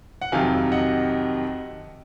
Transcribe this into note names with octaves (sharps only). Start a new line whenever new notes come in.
F#5
F2 C3 D#3 F#3 F5 G#5
D#5 F#5